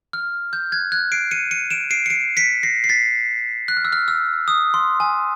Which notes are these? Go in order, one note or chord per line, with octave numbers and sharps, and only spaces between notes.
F6
G6
F#6 G#6
F#6 G#6
C7 D7
C#7 D#7
C#7 D#7
D7 E7
C7 D7
C#7
C7 D7
B6 C#7
A#6 C7
C7
A6 B6
F#6
F6
E6
F6
E6
D#6
C6
G#5